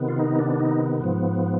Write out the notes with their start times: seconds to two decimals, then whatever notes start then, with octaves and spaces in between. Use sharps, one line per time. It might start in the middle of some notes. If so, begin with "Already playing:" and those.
Already playing: C3 D#3 B3
0.08 F4
0.19 D#4
0.39 D4
0.60 D#4
1.00 G#2 F3 B3